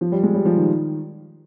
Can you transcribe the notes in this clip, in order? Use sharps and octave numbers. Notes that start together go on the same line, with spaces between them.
F3
G3
G#3
G3
F3
D#3